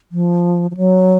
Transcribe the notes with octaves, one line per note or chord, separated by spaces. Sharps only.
F3
F3
F#3